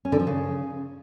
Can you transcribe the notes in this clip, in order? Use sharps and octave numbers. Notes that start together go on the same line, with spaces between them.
C#4
D3
F3
C#3